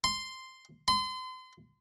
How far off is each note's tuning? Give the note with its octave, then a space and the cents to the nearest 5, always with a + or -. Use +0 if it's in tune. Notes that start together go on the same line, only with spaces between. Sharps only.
C6 -5
C6 -35